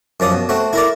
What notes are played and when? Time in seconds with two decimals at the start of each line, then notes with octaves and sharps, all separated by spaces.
0.20 F#2 F3 D5 D#6
0.32 B2
0.49 A3 C4 F#4
0.73 E4 A#4 D5